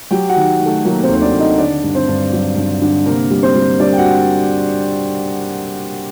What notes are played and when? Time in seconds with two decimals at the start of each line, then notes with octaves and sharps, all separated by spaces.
0.11 F#3 G4 G5
0.29 F#4 F#5
0.36 D#3
0.60 D#3
0.66 A3 A4
0.85 F#3 A#3 A#4
1.03 C4 C5
1.09 D#2
1.14 C5
1.22 D4 D5
1.34 D#2
1.40 D#4 D#5
1.58 D3 D4 D5
1.83 G2
1.95 C4 C5
2.08 G2
2.32 F#3
2.57 G2
2.82 D3
3.06 C3 A#3 A#4
3.31 G3
3.43 C4 C5
3.55 G3
3.80 G3 D4 D5
3.93 G5
3.98 F#4 F#5